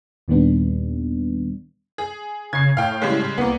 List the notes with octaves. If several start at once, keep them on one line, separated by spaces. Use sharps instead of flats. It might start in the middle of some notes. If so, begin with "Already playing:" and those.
D#2 A#2 D#3 G3 B3 D4
G#4
C#3 G#6 C7
A2 F5 G5
C#3 G3 G#3
C2 A#3 B3